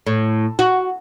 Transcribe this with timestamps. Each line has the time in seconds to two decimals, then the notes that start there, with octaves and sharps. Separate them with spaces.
0.06 A2
0.59 F#4